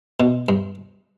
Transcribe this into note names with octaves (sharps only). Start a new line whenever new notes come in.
B2
G2